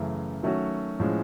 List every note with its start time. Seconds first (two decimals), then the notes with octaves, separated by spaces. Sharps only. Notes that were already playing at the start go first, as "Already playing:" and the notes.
Already playing: F#2 C#3 E3 A3
0.43 D#3 F#3 A3 C#4 F#4
1.00 A2 F3 G#3 C#4